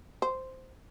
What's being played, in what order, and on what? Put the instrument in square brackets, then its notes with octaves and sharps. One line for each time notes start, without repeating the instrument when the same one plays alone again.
[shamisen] C5